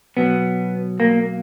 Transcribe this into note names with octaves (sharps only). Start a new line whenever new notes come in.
B2 F#3 B3
A#3